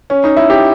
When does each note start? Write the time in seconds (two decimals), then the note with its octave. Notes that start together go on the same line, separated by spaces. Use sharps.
0.10 C#4
0.24 D#4
0.37 E4
0.50 G4